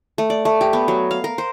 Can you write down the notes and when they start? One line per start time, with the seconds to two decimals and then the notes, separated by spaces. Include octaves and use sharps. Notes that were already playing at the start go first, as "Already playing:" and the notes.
0.18 A3
0.30 D5
0.45 A3
0.61 G4
0.73 B3
0.88 F#3
1.11 F5
1.24 A#4
1.38 C5